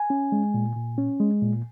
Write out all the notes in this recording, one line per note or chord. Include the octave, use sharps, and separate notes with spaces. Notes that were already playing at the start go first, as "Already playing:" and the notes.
Already playing: G#5
C#4
G#3
A#2
A#2
C#4
G#3
A#2